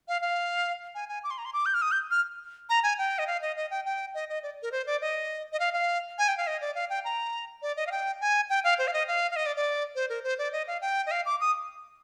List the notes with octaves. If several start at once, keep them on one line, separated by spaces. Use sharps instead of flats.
F5
F5
G#5
G#5
D6
C6
A#5
C6
D6
G6
F6
D#6
G6
F6
A#5
G#5
G5
D#5
F5
D#5
D#5
G5
G5
D#5
D#5
D5
A#4
C5
D5
D#5
D#5
F5
F5
G#5
G5
F5
D#5
D5
F5
G5
A#5
D5
D#5
F5
G5
G#5
G5
F5
C5
F5
D#5
F5
F5
D#5
D5
D5
C5
A#4
C5
D5
D#5
F5
G5
D#5
F5
D6
D#6